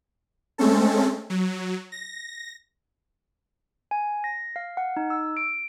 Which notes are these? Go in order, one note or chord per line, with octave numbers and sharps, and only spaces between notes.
G#3 A3 C4 C#4 A4
F#3
A#6
G#5
A#6
F5
F#5
D#4
E6
D7